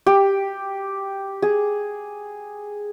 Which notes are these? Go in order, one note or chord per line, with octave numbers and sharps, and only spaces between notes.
G4
G#4